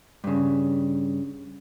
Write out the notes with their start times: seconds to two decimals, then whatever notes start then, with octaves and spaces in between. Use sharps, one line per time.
0.24 G2 C#3